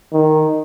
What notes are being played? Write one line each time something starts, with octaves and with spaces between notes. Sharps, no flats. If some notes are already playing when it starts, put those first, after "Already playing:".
D#3